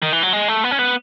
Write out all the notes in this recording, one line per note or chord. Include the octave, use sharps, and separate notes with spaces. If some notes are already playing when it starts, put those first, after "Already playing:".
D#3
E3
F#3
G#3
A3
B3
C#4
B3